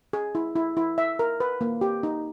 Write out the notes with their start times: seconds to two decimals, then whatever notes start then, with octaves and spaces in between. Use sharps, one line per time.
0.13 G#4
0.35 E4
0.56 E4
0.77 E4
0.98 E5
1.19 A#4
1.40 B4
1.61 A#3
1.81 G4
2.03 D#4